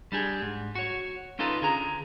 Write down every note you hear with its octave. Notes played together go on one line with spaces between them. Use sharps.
G3 D4 G4 G#4
G#2
F#4 C#5
C#4 D#4 F4 A4 B4
D3 G#4 A#5